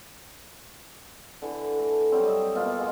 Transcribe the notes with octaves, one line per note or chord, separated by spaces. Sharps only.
D3 E3
A3
F#3 G3 C4
D#5 E5
B2 A#3 F4
G#3 F#5